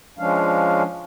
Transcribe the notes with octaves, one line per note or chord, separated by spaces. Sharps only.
F3 G#3 C#4 D4 F5